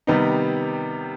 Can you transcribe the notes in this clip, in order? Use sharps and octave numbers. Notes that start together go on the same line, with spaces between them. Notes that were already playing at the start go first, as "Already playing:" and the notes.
C3 D#3 G3 B3 D#4